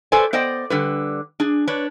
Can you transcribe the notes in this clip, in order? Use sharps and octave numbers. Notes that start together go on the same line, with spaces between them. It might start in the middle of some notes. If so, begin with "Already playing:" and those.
A4 B4 C5 D5 G#5
B3 C5 D5 D#5 G5
D3 G3 B4
D4 G#4
D4 B4 C#5